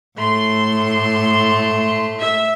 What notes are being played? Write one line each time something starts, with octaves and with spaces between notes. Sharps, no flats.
A2 A3 C6
E5